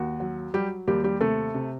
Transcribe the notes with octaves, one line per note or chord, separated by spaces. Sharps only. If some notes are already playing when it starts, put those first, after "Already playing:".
Already playing: D#2 F#4
F#3
F#3 G3 G4
D#2 G3 G4
G3 G4
C3 A3 A4
C3